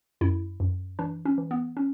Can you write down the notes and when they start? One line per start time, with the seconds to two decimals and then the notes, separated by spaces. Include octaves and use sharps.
0.21 F#2 E4
0.60 F#2
0.99 E3 D4
1.25 C#4
1.38 E3
1.51 B3
1.77 C#4